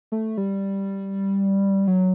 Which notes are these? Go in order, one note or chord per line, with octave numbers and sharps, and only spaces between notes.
A3
G3
F#3